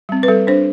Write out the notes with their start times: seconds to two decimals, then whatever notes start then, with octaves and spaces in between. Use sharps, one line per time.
0.09 G3 C4
0.23 B4
0.28 G3 A4
0.47 D4 C5